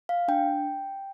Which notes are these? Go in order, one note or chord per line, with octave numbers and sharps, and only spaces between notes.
F5
D4 G5